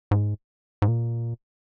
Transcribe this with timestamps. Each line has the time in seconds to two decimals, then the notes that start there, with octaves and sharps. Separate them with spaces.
0.11 G#2
0.82 G#2
0.88 A#2